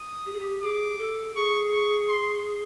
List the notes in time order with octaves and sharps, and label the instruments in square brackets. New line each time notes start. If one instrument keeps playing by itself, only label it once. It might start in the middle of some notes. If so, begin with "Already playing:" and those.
Already playing: [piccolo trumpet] D#6
[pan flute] G4
G#4
G4
[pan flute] G#4 [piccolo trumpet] D6
[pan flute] A4
[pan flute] G#4 [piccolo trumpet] C#6
[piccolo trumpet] C#6
C6